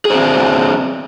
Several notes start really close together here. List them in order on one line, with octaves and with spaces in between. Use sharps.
G#4 C5 C4 D4